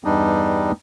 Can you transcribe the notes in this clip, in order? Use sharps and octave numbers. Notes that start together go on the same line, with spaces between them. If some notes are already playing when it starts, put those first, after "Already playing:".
E2 G2 G3 D4 D#4